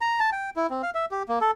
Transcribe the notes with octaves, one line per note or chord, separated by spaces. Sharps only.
A#5
A5
G5
E4
C4
F5
E5
G4
A#3
A4